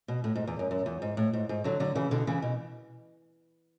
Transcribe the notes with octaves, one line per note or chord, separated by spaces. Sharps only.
B2
A2
G#2
E2
F#2
F#2
E2
G#2
A2
G#2
G#2
D3 F#3
D3 F#3
C#3 E3
B2 D3
C#3 E3
B2